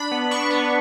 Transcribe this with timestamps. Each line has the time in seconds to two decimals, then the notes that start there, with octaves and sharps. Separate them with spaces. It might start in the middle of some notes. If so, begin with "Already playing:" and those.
Already playing: D4 B5
0.11 B3
0.31 D4 C#6
0.50 B3